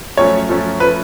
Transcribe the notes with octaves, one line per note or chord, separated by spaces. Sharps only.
F#2 F3 A3 C#4 C#5
F#2 F3 A3 C#4
F3 A3 C#4 B4